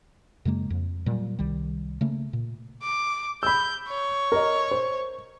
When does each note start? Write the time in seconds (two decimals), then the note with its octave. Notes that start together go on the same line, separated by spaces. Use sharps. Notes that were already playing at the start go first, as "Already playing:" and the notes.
0.45 F#2 C#3 G#3 A#3
0.70 F2
1.06 A#2 F#3 G3
1.39 C2 D#3 G3
2.01 C#3 A3 A#3
2.33 A#2
2.82 D6
3.43 B5 E6 G6
3.88 C#5
4.32 A#4 D#5
4.71 C5